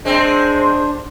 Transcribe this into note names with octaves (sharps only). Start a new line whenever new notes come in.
G#3 C4 D4 C5